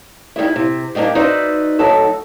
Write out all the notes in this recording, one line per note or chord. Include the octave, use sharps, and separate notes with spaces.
D#3 G3 G#3 E4
C3
G3 A#3 D4 D#4 G4
D#4 F#4 B4 C5 D5 E5
F#3 A3 D#4 F#4 A4 E5